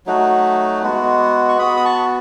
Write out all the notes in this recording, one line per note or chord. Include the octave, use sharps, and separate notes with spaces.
F#3 A3 D#4 F#4
G#3 B3 F#4
C#6
B3 F#4 B5 D#6
D#6
A5 C#6